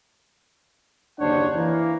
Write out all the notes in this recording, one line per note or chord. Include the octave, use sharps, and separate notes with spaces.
F#1 D#2 D4 C5 C#5 F#5
E3 A#3